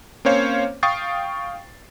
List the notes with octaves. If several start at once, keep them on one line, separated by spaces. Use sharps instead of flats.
A#3 C4 C#4 C5 C#5 F5
F5 G5 C#6 D#6 A6 C7